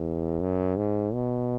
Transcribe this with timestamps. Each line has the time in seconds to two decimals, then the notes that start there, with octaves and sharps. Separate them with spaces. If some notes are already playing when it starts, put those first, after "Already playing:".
Already playing: E2
0.41 F#2
0.77 G#2
1.13 B2